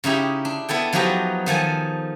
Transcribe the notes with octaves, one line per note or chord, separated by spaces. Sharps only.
C#3 D#4 E4 G4
D4
B3 E4 A4 G5
F3 F#3 D#4 F#4 G4 B4
D#3 F3 A4 G#5